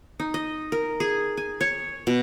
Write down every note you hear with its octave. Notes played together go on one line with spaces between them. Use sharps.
D#4
D#5
A#4
G#4
G#5
C#5
B2